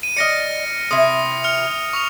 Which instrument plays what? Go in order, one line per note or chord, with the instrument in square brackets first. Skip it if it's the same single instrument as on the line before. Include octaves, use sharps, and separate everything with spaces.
[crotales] D#7
[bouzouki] D5 D#5 [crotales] F6 A#6 C#7
[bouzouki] C3 E4 [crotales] D#6
[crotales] F6 C#7 F7
C#6 D#6 F7